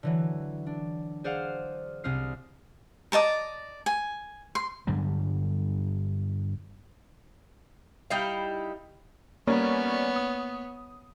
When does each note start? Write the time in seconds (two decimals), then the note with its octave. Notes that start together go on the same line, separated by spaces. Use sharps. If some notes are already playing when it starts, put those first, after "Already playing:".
0.03 D3 E3 F#3
0.67 D4
1.24 G#4 C5 D5 F5 F#5 F6
2.04 C2 C3 C4 D#6 F6 C7
3.12 D5 D#5 A5 A#5
3.86 G#5
4.55 C6
4.87 G2 D3 F#3 G3
8.10 G3 D#4 E4 F5
9.47 G3 A#3 B3 C#4 A#4 C#5
10.16 D#6